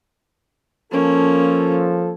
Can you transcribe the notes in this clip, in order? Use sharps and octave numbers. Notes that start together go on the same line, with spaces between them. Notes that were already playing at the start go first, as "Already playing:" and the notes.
F3 A#3 C#4 A4